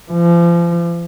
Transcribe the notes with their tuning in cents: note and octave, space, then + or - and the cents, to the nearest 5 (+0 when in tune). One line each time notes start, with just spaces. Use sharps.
F3 -35